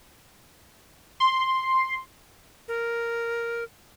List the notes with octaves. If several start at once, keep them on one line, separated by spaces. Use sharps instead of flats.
C6
A#4